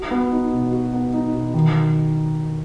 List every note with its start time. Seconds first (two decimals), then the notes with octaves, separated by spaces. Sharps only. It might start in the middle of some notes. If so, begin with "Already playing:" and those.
Already playing: F#4
0.11 B3
0.31 D#4
0.52 B2
0.72 F#4
0.93 B3
1.13 D#4
1.34 B2
1.54 D#3